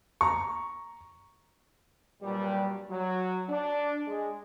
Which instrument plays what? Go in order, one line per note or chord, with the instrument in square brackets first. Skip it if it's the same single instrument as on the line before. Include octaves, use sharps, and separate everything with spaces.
[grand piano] A#5 C#6
[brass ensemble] G2 A#2 F#3 G3
F#3
D4
G#3